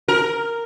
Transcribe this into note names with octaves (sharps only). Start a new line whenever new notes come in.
A#4